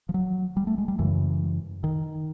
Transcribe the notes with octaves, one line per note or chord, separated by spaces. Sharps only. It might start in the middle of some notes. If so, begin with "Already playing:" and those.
F3
F#3
G3
A3
G#3
G3
F#2 C#3 E3
D#3